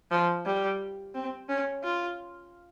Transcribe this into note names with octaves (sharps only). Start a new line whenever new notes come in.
F3
G3
C4
C#4
F4